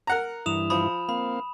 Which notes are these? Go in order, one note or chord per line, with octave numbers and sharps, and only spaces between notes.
A#4 F#5 A#5
G2 E3 E4 D#6 E7 F7
F3 B5 D#6
A#3 C4 F5 B5